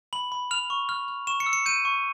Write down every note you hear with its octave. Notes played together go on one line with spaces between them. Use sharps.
B5 F#7
B5
F6 F7
C#6
F6
F6
C#6 E7
C#7
E6
C#7
G6 D#7
C#6